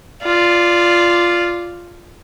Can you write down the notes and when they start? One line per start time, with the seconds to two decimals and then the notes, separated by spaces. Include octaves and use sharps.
0.23 F4 D5